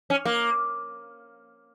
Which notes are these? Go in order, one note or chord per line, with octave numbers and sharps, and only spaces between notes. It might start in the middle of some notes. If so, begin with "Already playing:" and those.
C#4
A#3